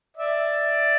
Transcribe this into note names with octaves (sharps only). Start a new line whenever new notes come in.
D5 E5